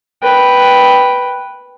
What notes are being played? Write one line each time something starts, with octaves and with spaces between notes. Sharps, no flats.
B4 G5